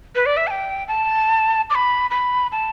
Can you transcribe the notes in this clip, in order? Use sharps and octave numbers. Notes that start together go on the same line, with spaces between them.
B4
D5
E5
A5
G5
A5
D6
B5
B5
A5